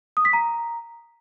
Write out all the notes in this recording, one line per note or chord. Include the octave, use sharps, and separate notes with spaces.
D#6
B6
A#5